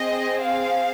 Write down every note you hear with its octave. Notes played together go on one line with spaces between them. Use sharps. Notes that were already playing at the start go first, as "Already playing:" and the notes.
Already playing: C4 G#4 D#5
F5